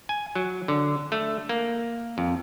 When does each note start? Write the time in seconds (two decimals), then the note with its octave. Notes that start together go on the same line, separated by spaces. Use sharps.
0.09 G#5
0.35 F#3
0.68 D3
1.12 A3
1.49 A#3
2.18 F2